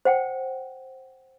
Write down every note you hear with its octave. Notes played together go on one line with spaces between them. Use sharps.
C5 F#5 G5